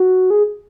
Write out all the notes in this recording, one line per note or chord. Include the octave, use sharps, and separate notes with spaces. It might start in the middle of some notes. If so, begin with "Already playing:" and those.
Already playing: F#4
G#4